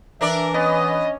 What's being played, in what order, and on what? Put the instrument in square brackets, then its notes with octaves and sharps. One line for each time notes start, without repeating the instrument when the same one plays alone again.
[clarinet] E3 [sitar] D4 A#4 D5 [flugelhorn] E5
[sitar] B3 [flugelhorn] C#4 [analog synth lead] D#5